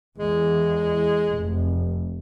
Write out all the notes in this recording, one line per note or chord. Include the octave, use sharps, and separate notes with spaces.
E2 G#3
F1